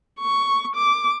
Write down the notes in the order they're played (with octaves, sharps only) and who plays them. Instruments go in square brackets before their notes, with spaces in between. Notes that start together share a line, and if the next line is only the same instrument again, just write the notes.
[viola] C#6
D6